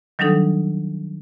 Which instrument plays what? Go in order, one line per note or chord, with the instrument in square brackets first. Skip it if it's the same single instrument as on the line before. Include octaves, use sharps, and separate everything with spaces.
[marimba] D#3 F#3 G3 D4 D#4 A4